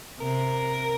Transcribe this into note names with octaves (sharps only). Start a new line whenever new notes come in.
C3 A#4